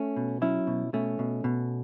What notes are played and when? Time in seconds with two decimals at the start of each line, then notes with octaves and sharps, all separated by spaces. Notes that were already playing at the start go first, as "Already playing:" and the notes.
Already playing: A3 C#4
0.16 B2
0.42 F#3 C#4 E4
0.67 B2
0.93 B2 A3 C#4
1.19 B2
1.44 B2